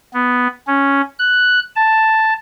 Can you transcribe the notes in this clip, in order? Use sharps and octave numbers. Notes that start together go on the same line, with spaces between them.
B3
C#4
F#6
A5